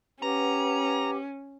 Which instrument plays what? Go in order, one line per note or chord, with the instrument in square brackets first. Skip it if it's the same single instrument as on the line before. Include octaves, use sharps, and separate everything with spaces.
[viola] C#4 [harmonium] G4 [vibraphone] B4 F#5 [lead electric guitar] A#5